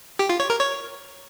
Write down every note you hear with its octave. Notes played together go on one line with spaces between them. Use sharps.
G4
F4
C#5
A#4
C#5